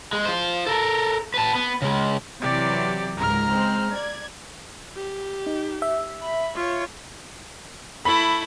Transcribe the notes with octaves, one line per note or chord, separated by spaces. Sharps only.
G#3
F4 C5
A4 A#4
B4 A5
B3
C#3 G#3
C3 E3 F#3 G4 D5
C#2 G#2 A#4 A#5 F6
G#3 C4
D5 G#6
G4
D#4
E5
B5
F4 C#5
A3 E4 B5